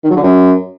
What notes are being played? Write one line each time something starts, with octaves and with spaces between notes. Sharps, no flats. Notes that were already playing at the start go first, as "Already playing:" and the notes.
D#3
F#3
D3
F#2